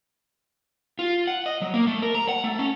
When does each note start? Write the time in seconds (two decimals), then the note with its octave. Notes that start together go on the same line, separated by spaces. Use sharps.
0.99 F4
1.27 F#5
1.46 D#5
1.62 F#3
1.74 A#3
1.87 A3
2.02 A#4
2.15 A#5
2.29 F#5
2.44 A3
2.59 C#4